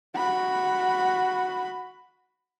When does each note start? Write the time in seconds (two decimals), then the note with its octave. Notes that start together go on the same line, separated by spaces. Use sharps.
0.16 F#4 B5